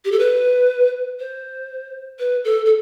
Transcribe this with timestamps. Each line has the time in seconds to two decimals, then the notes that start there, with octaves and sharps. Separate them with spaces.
0.05 G4
0.12 A4
0.19 B4
1.20 C5
2.19 B4
2.45 A4
2.66 A4